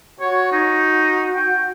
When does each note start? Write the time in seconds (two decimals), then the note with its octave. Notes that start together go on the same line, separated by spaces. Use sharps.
0.20 F#4 C#5
0.52 D#4
1.35 G5